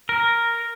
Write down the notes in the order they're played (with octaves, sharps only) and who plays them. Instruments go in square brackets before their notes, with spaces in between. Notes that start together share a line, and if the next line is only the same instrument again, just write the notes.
[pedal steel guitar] A#4